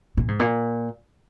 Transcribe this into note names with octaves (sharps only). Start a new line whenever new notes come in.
A#2
G#2
A#2